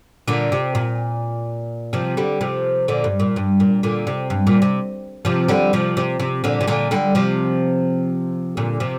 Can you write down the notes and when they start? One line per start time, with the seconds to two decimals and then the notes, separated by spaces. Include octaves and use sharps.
0.28 A#2 D3
0.52 C3
0.75 A#2
1.93 C3 F3
2.17 D3 G3
2.41 C3 F3
2.88 A#2 D3
3.04 G2
3.20 A#2
3.36 G2
3.60 A#2
3.83 A#2 D3
4.07 C3
4.30 G2
4.47 A#2
4.62 C3
5.25 C3 F3
5.48 D3 G3
5.73 C3 F3
5.97 C3
6.20 C3
6.44 A#2 D3
6.61 C3
6.68 A#2 D3
6.91 D3 G3
7.15 C3 F3
8.57 A#2 D3
8.80 C3 F3